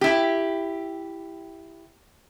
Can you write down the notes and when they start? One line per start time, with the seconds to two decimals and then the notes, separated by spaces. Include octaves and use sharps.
0.01 E4 G4